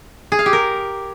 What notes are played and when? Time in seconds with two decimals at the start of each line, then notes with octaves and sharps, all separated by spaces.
0.32 G#4
0.39 F5
0.46 G4
0.53 A#4